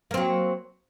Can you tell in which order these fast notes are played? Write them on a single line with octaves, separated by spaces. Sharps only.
A#3 C4 F#3